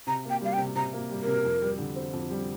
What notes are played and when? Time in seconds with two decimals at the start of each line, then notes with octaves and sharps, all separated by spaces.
0.07 C3 A#5
0.25 A#3 G5
0.41 G3 F5
0.53 G5
0.58 C3
0.76 C3 A#5
0.93 A#3
1.11 G3
1.22 A#4
1.27 C3
1.45 F2
1.62 G3
1.79 D3
1.96 C4
2.13 F2
2.30 G3